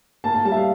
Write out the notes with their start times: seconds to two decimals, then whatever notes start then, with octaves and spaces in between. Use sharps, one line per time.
0.24 A#3 A5
0.34 A5
0.45 G3 A5
0.52 E5
0.57 F5